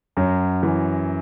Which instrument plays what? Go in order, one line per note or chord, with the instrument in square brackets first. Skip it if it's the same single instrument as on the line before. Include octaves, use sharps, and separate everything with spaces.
[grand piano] F#2 F#3
E3